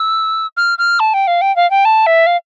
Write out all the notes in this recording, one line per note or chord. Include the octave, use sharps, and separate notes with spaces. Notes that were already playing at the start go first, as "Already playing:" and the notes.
Already playing: E6
F6
F6
A5
G5
F5
G5
F5
G5
A5
E5
F5